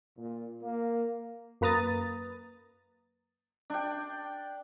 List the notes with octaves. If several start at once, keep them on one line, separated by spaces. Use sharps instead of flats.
A#2
A#3
F#2 A#3 B4 A#5 D#6 A6
D4 G5